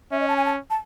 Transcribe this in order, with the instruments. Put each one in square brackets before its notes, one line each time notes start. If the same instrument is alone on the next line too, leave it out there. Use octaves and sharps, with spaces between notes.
[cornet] C#4 [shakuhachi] E5
[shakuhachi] D#5
A5
G#5
A5
A5